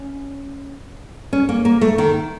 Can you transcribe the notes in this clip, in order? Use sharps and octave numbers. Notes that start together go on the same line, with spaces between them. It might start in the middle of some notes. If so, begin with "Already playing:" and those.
Already playing: C#4
C#4
A#3
A#3
A3
D#3